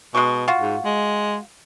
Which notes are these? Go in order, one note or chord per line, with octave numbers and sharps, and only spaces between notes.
B2 G#3 C#6
F4 F#4
G#2
G#3